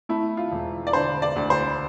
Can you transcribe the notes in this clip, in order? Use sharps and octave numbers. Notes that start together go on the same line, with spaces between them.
A3 E4
F4
E1
D5
D3 C5
D5
D2
C5